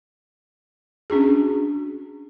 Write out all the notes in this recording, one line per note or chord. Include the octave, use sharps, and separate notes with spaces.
C#4 D4 F#4 G#4